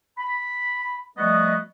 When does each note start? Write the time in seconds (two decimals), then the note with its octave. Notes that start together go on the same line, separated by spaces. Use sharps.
0.18 B5
1.18 F3 G3 A3 B3 F#4 D#5